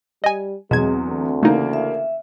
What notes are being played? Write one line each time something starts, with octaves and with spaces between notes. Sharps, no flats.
G3 D#5 G#5
E2 B2 F#3 G#3 C4 G#6
D2
C#3 E3 A3 A#3 D#4
E5